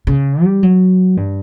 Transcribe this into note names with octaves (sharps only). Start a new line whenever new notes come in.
C#3
G3
F#3
G2